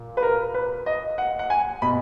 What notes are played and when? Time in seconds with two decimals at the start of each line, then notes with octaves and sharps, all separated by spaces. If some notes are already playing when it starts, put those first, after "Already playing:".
Already playing: A#2
0.17 B4
0.23 A#4
0.54 B4
0.86 D#5
1.18 F#5
1.39 F#5
1.50 G#5
1.82 B2 B5